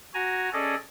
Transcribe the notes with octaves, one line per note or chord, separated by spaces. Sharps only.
F#4 G#5 A#5
C#4 G#4 A4 D5 D#5